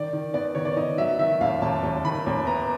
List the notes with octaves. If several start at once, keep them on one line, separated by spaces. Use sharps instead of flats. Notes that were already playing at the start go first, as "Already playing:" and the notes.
Already playing: D#3 D5
D#3
B3 D5
D#3 C#5
D5
D#3 D#5
F#3 E5
D#3 E5
D#2 F5
D#2 A5
D#2
D#3 B5
D#2
B3 A#5